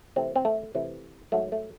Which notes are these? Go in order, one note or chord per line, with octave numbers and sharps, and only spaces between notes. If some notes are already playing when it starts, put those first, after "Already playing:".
C3 E3 A3 C4
C4
A3
C3 E3 A3
G#2 F#3 A3
A3